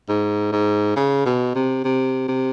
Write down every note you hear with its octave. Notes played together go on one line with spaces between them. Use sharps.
G#2
G#2
C#3
B2
C3
C3
C3